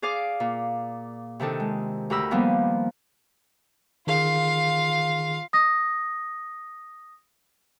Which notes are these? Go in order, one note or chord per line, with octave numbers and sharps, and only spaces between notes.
G#4 D5 F5 D6
A#2
C3 D#3 D4 A4
G#3
D2 G4 A#4 B5 E6
D#3 F3 G3 A#3 B3
D#3 F4 G#4 F5
D#6 A#6